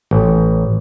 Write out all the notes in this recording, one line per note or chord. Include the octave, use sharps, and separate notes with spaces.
A1